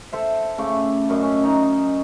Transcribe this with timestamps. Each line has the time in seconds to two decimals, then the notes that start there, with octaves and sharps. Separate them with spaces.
0.12 A4 C5 E5
0.58 C#3 A3 D6
1.09 F#2 D4 D#5
1.23 C#4
1.44 D#4 A#5